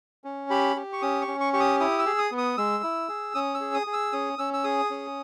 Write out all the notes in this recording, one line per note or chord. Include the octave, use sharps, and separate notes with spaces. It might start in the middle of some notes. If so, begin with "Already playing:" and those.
C#4
G4 B5
G4
C#6
C#4 D#6
C#6
C#4
C#6
G4 C#6
D#6
E4 D#6
E6
G#4
D#6
B3
D#6
G#3 E6
E4
G#4
C#4 D#6
E6
G#4
D#6
G#4
E6
C#4 D#6
C#4 E6
E6
G#4 D#6
C#4